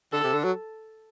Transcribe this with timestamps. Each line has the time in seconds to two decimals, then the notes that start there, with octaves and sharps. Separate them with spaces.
0.13 D3 A4
0.24 C3
0.34 D3
0.44 F#3